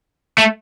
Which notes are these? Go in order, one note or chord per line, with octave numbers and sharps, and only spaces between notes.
A3